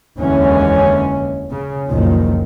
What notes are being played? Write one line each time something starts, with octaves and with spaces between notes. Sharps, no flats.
F1 D#2 D3 E3 G#3 C#4
C#3
F#1 C#2 A#2 D#3 F3